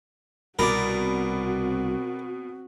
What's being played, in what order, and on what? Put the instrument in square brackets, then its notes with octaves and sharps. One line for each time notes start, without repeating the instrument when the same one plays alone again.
[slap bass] C2 [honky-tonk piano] B2 B5 [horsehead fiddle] C4 F#4 [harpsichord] A#4 D5